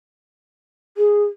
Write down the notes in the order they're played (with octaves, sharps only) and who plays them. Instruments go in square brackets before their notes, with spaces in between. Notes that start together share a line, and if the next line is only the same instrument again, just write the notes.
[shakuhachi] G#4